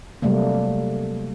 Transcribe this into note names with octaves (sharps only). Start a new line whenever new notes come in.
C3 F#3 G3 A3 A#3